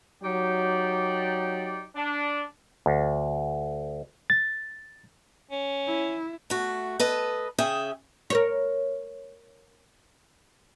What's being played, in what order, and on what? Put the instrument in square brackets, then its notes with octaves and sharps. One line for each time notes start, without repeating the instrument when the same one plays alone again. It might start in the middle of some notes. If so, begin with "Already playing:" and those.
[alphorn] F#3 [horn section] D#4 G4 D5
[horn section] D4
[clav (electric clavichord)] D2
[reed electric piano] A6
[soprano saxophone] C#4
[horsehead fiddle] E4
[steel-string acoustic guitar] A3 F#4
A4 B4 D#5
C#3 G#4 E5 G5
[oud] A#4 C5 C#5